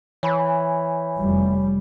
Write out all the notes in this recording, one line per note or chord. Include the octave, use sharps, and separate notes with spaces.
E3 C#5 G#5 B5
F1 G3